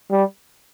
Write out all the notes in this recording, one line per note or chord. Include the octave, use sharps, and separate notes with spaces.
G3